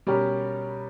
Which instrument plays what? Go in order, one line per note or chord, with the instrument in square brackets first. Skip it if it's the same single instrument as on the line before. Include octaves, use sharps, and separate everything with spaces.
[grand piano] B2 G3 C#4 G4 A#4